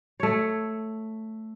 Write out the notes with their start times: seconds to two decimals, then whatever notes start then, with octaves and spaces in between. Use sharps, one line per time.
0.20 A3 C#5